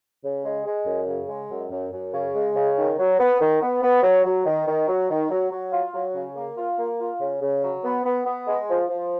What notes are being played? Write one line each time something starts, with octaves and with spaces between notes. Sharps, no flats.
C#3
G#3
G#3
F#2
C#3
G#3
F#2
F#2
F#2
C#3
G#3
C#3
D#3
F#3
B3
D#3
B3
B3
F#3
F#3
D#3
D#3
F#3
D#3
F#3
F#3
F4
F#3
C#3
A#3
F4
A#3
F4
C#3
C#3
F#3
B3
B3
B3
G#3
F3
F3